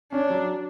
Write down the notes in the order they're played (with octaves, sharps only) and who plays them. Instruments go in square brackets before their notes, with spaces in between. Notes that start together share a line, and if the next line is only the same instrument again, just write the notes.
[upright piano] C#4 [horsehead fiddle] D4
[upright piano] F#3